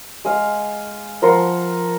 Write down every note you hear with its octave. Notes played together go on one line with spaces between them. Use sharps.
G#3 F5
F3 A#4 F#5 C6